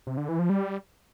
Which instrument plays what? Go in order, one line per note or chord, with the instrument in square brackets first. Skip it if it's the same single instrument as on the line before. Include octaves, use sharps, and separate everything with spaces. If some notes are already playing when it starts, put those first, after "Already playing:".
[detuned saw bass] C3
D3
E3
F3
G3